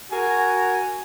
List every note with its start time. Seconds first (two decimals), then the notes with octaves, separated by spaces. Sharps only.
0.12 F#4 A#4 G#5